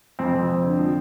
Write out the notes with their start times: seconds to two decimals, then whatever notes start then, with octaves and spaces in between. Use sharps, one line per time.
0.19 F2 C4
0.34 F2
0.49 F2
0.64 D3
0.79 F3